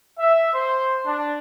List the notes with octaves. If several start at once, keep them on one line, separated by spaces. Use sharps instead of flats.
E5
C5
D4